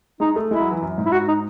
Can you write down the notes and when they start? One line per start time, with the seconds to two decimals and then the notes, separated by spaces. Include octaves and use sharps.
0.20 G#3 D#4
0.36 A3
0.51 G#3 E4
0.61 F#3
0.71 E3
0.82 F#2
0.98 G#2
1.06 E4
1.12 F#4
1.28 D#4